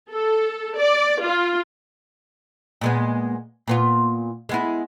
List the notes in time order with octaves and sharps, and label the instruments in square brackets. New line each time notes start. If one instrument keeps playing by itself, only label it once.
[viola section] A4
D5
F4
[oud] A#2 G#3 B3
A#2 B3 F4
G#3 B3 E4